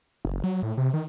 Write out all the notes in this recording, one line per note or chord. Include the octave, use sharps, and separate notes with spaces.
F#1
F#3
A2
C3
D#3